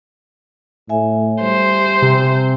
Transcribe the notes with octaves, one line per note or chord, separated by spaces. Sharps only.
A2 E5 G#5
G3 C5
C3